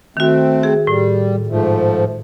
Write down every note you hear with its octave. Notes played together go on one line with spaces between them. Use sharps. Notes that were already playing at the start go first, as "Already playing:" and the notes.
D#3 A3 C4 F#4
G#4
A2 G3
G#2 F3 A3